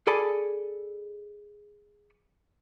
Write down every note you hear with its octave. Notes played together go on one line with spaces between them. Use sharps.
G#4 A4 D5 G#5 A5 B5